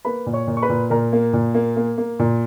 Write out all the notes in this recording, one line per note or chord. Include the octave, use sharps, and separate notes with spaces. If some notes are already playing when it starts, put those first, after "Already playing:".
A#3 B4 B5
A#2
C#5 C#6
A#2
C#6
B4 B5
A#2
A#2 A#4 A#5
A#3
A#2
A#3
A#3
A#3
A#2